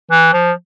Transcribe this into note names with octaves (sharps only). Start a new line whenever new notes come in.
E3
F3